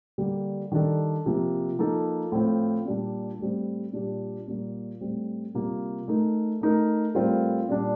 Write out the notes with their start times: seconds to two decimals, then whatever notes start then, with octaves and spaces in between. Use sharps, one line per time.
0.18 D3 G3 A#3
0.72 D#3 G3 D4 A4
1.26 C3 F3 A#3
1.79 F3 A#3 D#4 A4
2.32 A2 F3 C4 F4
2.86 A#2 G3 A#3 D4
3.39 A2 G3 C4
3.93 A#2 G3 D4 G4
4.48 A#2 G3 A#3
5.00 A2 G3 C4
5.54 C3 G3 A#3 F4
6.08 A3 D#4 A#4
6.61 A3 D#4 A#4
7.15 A2 G3 C4 F4 A#4
7.69 A#2 G3 D4